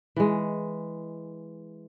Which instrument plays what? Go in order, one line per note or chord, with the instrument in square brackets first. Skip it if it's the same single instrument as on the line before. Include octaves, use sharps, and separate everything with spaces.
[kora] E3 G#3